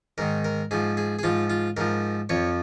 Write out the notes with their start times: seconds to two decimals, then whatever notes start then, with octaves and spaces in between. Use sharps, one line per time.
0.18 G#2 D#3 A#4
0.45 A#4
0.71 G#2 F3 G#4
0.97 G#4
1.19 G#4
1.23 G#2 F3 F4
1.50 F4
1.77 G#2 F3 A#4
2.29 F2 F3 C#5